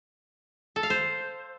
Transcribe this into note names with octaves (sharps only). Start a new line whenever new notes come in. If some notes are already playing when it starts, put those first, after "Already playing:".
A4
F5
C5